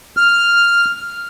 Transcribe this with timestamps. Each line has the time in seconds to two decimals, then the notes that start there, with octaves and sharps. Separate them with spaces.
0.17 F6